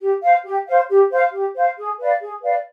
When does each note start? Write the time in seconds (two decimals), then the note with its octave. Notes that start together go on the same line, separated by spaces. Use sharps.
0.01 G4
0.22 C5 F5
0.44 G4
0.66 C5 F5
0.89 G4
1.10 C5 F5
1.33 G4
1.55 C5 F5
1.77 G#4
1.98 B4 D5 F5
2.21 G#4
2.43 B4 D5 F5